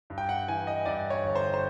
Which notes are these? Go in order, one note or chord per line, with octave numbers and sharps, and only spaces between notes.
G2
G5
F#5
E3 G#5
D#5
G2 D5
C#5
G1
C5
C5